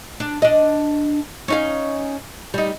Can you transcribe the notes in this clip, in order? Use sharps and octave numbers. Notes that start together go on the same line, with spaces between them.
D4
D4 D#5
C#4 D#4 F5
G3 D#4